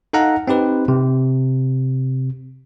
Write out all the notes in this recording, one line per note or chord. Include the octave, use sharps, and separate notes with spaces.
D#4 A4 F5 F#5 A#5
C4 D#4 G4 B4
C3